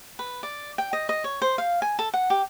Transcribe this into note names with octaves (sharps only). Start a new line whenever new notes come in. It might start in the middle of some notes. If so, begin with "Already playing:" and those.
B4
D5
G5
D#5
D#5
C#5
C5
F5
G#5
A4
F#5
G4